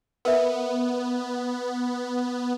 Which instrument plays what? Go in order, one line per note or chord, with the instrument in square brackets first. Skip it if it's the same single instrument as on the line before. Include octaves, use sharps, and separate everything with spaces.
[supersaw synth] B3 [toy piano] A#4 B4 E5